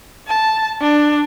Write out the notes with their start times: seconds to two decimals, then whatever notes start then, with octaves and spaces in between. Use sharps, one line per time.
0.27 A5
0.81 D4